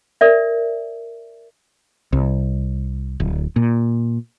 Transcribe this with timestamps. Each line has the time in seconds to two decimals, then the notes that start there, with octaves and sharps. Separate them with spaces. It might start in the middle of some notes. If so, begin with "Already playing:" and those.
0.21 A#4 D5 E5
2.13 C2
3.20 D1
3.56 A#2